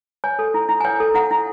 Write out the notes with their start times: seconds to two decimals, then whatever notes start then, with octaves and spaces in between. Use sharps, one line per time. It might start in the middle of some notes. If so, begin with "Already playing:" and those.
0.24 C#5 G#5
0.39 A4
0.54 E4
0.69 E4
0.81 G#5
0.85 C#5 G5
1.00 A4
1.15 E4 F#5
1.31 E4